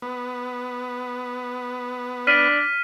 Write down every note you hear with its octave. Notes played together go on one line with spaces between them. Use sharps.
B3
D4 F6 B6 D#7